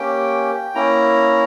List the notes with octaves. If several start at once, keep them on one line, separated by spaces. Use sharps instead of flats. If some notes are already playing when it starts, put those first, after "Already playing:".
Already playing: A#3 C#4 G4 G5
A#3 C#4 E4 A#5